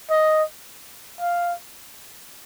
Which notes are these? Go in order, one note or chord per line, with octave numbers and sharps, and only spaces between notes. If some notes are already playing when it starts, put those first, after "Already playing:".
D#5
F5